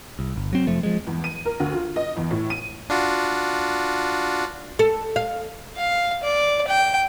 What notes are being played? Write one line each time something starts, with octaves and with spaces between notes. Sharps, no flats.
C2
G1
F#3 C4
F1 F3 A3
F3 G#3
E2
D#7
A#4
D2
F4
D#5
E2
A2
D#7
D4 F4 F#4
A4
F5
F5
D5
G5